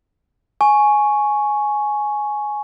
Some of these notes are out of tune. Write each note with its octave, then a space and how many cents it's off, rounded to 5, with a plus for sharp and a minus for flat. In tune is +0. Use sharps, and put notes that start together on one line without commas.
G#5 +10 C#6 +0